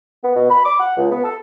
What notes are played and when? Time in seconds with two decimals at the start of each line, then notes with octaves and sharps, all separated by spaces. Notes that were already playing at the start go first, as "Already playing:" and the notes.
0.24 B3
0.35 B2
0.50 B5
0.64 D6
0.80 F#5
0.97 C#2
1.12 B3
1.24 A4